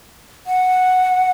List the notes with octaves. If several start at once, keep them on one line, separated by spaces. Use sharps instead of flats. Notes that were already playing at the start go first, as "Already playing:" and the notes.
F#5